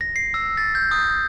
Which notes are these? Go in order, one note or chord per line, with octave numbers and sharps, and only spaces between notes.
A#6
C7
E6
A6
G6
D#6
D#6